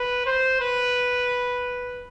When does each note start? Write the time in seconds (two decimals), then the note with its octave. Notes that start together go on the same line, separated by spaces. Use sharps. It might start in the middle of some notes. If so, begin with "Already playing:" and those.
Already playing: B4
0.26 C5
0.61 B4